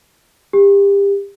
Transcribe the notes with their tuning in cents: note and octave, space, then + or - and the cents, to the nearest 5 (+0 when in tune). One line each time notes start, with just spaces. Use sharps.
G4 +30